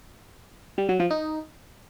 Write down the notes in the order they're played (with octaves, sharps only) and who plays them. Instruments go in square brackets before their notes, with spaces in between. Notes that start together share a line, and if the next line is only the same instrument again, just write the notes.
[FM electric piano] G3
F#3
F3
D#4